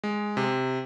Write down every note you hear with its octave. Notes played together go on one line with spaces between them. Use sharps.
G#3
C3